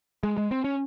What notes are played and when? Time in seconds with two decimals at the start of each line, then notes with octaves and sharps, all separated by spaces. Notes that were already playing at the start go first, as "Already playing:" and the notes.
0.23 G#3
0.37 G#3
0.51 C4
0.64 C#4